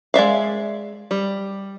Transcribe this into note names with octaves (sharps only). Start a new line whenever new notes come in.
G#3 D5 E5 F5
G3